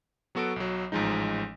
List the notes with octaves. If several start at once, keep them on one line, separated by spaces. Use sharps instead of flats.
F#3 B3 F#4 A4 C#6 D7
B1 F#3
A1 G#2 F3 G#3 D#4